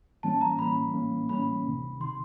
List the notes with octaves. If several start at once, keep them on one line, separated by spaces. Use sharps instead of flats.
A2 E3 G3 A#3 C#4 A5
A#5
A2 E3 G3 A#3 C#4 B5
A2 E3 G3 A#3 C#4
A2 E3 G3 A#3 C#4 B5
D2 C3 D#3
C3 D#3 C6